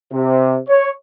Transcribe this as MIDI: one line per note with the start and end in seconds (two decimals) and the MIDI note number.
0.11 0.57 48
0.68 0.89 73